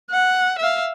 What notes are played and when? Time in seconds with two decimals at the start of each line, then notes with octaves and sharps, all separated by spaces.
0.10 F#5
0.58 E5 F5